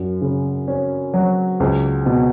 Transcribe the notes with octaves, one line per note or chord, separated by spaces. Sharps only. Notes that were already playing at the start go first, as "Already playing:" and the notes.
Already playing: F#2
C#3
C#4
F#3
C#2
B2